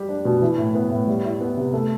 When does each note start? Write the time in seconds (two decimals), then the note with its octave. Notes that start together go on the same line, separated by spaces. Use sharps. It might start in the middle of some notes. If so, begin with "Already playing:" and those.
Already playing: G3 G4
0.09 D4
0.25 B2
0.42 E3
0.58 A2
0.75 B3
0.90 A2
1.07 G3
1.24 E4
1.41 B3
1.57 C3
1.73 A3